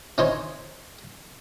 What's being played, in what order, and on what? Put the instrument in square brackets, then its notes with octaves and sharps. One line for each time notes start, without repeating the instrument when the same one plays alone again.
[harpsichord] C#4 D#4 C5 C#5